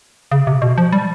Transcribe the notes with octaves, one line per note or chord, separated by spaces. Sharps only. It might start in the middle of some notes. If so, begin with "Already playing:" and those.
C#3
C3
B2
F3
G3